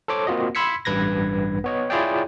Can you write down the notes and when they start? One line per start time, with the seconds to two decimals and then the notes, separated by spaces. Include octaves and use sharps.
0.08 A4 C5 C#5 D6
0.27 A#3 C4 F4 F#4 D#5
0.55 B5 C6 E6 G#6 B6 C#7
0.85 A1 G2 B4 G#6 A#6
1.64 B3 C#5 D#5
1.90 E4 F4 G#4 C#5 D5 G5